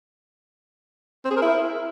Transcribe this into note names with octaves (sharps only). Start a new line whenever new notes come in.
C4
G#4
A#4
E4